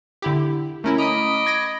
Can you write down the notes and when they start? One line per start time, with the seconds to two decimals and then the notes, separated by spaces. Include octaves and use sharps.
0.22 D3 E4 G4
0.84 A3 C#4 E4 A#4
0.98 D#5 A#5 B5 D6 D#6
1.46 G#6 A#6 D7